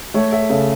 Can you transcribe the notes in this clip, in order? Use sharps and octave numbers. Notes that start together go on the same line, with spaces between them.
A3 C#5 E5
C#5 E5
C#3 A4 C#5